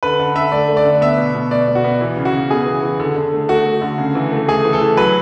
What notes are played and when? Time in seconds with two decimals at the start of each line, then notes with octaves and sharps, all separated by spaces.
0.03 D3 B4
0.19 D3
0.36 D3 E5
0.52 A3 D5
0.68 A3
0.77 D5
0.85 D3
1.01 B3 E5
1.18 B2
1.35 B2
1.51 B2 D5
1.68 B2
1.75 F#4
1.84 B3
2.01 E3
2.17 C#3
2.25 F#4
2.34 C#3
2.50 B3 G#4
2.66 E3
2.83 E3
3.00 D3
3.16 D3
3.33 A3
3.48 A3 F#4
3.65 A3
3.81 D3
3.98 C#3
4.15 E3
4.32 A3
4.48 A3 G#4
4.65 E3
4.73 A4
4.81 E3
4.97 F#3 B4